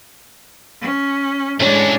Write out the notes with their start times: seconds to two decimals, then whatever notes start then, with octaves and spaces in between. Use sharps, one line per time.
0.81 C#4
1.60 A2 G#3 C#4 D4